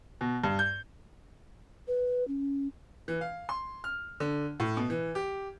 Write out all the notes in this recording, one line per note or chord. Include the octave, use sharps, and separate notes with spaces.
B2
G2
G6
B4
C#4
E3
F5
C6
F6
D3
A2
B2
E3
G4